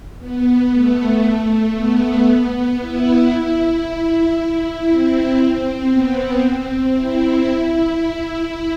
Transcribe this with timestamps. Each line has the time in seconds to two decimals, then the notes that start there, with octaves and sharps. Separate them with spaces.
0.19 B3
0.71 A3
1.23 A3
1.74 B3
2.78 E4
3.30 E4
4.33 E4
4.85 C4
5.89 B3
6.41 C4
6.93 E4
7.44 E4
7.96 E4